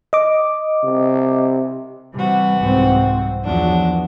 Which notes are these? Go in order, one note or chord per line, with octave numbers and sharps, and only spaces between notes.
D#5 D6
C3
C3 E3 G3 F#4
C2 G#2 C4
E2 F3 F#3 D4 F#4